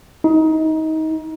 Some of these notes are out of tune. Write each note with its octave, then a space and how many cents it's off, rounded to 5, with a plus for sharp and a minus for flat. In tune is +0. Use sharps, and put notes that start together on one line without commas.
D#4 +25